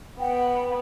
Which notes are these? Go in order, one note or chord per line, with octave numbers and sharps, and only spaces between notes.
B3 F#5 G5